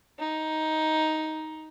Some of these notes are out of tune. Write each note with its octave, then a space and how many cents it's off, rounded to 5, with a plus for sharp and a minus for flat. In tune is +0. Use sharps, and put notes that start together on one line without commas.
D#4 +10